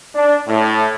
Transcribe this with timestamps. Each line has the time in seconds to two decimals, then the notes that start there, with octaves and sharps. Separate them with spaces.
0.15 D4
0.48 A2